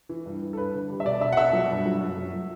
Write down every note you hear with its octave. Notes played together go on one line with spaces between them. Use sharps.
E3
G2
E3
A4
G2 B4
D3
G3
E5
B2 D5
B2 E5
F#5
B2 E5
F#3
G2
F#3
F#2
F#3
F#3